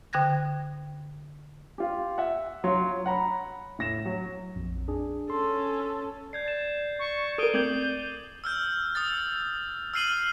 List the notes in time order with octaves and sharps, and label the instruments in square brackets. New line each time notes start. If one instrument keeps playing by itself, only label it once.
[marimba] D3 G5 F#6 G#6 A#6
[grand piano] F4 G4
E5 F#5
F#3 F4 C6
C#5 F#5 A#5 B5
A2 A#6 E7
F#3
[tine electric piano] A#1 F2
D4 G#4
[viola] C#4 A4 [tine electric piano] C6
[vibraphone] D5 [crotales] G6 G#6 C7
[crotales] A6 E7
[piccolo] C#6
[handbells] A4 A#4 [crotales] D#6 D#7 G7 [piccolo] D7
[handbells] A3 C4 G#6 [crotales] D6 F#7 [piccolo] G6
[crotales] E6 F6 G6
D#6 E6 A6
E6 F6 C7 D#7 F#7